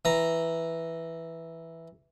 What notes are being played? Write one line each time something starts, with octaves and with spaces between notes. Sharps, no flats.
E3 A#5